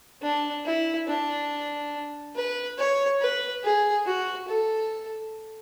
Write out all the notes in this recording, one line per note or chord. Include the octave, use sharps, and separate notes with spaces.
D4
E4
D4
B4
C#5
B4
G#4
F#4
A4